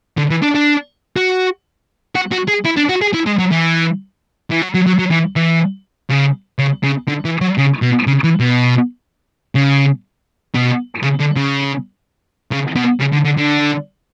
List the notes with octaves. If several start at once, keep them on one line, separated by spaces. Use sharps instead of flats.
D3
E3
D4
D4
F#4
F#4
F#4
G#4
E4
D4
F#4
G#4
E4
G#3
F#3
E3
E3
F#3
F#3
F#3
F#3
E3
E3
C#3
C#3
C#3
D3
E3
F#3
C#3
B2
C#3
E3
B2
C#3
B2
C#3
D3
C#3
C#3
B2
C#3
D3
D3
D3